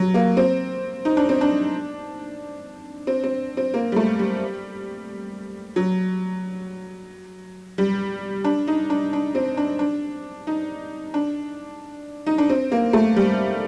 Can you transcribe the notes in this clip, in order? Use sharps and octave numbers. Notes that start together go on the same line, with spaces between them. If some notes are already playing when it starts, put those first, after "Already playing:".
Already playing: F#3
A#3
C4
D#4
D4
C4
D4
C4
C4
C4
A#3
G3
A3
G3
F#3
G3
D4
D#4
D4
D4
C4
D4
D4
D#4
D4
D#4
D4
C4
A#3
A3
G3